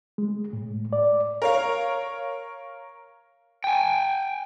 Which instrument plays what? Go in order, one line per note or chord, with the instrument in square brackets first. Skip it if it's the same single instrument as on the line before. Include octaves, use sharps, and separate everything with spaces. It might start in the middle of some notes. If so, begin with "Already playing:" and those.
[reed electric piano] G#3
A2
D5
[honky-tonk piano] A#4 C#5 F5
[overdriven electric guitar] G5 G#5